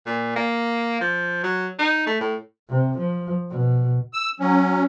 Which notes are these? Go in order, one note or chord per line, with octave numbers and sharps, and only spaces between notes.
A#2
A#3
F3
F#3
D#4
A3
A2
C3
F3
B2
E6
F#3 C#4